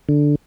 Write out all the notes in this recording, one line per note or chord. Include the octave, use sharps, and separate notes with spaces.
D3